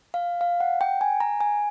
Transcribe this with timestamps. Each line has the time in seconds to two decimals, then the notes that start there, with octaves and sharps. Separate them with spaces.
0.14 F5
0.41 F5
0.60 F#5
0.81 G5
1.01 G#5
1.20 A#5
1.41 G#5